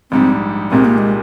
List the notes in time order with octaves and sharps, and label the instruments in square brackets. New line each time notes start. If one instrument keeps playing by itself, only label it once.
[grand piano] A#1 G#2 G3 [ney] C4
[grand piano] C2 A#2 G#3 D#4 G4 [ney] C4
[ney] A#3
G#3